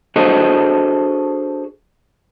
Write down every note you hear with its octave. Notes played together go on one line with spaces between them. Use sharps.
D4 F#4 G#4 A4 C5 D#5